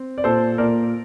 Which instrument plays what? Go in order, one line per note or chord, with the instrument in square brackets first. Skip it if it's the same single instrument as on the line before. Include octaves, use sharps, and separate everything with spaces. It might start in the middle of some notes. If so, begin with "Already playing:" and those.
Already playing: [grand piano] C4
D5
A#2 A4 C5
A#2 A#4 D5